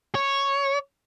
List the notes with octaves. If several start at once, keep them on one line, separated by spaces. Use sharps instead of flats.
C#5